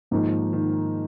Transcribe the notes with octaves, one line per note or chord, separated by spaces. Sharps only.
G#2 D#3 F3 A#3 D#4 A#4
D#3